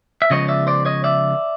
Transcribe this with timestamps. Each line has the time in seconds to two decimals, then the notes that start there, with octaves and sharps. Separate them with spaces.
0.22 E5
0.30 C#3 F3 G#3 B3 C#5 D#5
0.48 D5 E5
0.67 C5 D5
0.85 C#5 D#5
1.04 D5 E5